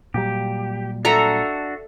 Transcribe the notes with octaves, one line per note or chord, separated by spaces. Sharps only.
A#2 F#3 G3 G4
D4 F#4 A4 E5 A#5